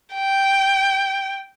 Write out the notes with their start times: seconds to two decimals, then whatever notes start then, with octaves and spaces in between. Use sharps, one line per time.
0.14 G5